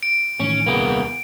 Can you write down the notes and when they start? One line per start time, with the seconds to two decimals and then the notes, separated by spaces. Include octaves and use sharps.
0.03 D7
0.40 A1 A2 D#3 C#4
0.66 D#1 C2 A#3 B3 G#4